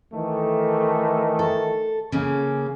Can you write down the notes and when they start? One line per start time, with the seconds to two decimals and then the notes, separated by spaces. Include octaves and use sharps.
0.13 D#3 E3 A3
1.39 A4
2.12 C#3 A#3 C#4